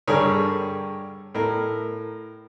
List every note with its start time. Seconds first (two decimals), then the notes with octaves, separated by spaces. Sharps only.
0.07 G2 D3 G3 G#4 A#4 C#5
1.35 A2 A#4